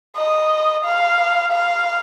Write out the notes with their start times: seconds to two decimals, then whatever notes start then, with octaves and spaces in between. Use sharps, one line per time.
0.16 D#5
0.85 F5
1.52 F5